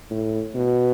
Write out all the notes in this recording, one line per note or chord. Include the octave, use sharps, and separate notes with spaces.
A2
B2